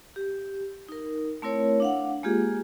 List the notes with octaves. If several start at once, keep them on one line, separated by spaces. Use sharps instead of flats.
G4
D#4 A#4
A3 C4 E4 A#4 C#5
D4 F5 F#5
G#3 A#3 F4 G4 G#4